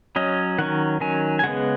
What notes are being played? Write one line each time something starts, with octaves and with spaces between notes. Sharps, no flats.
F#3 C#4 D#5
D#3 F#3 C#4 F#5
D#3 F#3 C#4 G#5
G#5
C#3 G#3 B3 F#5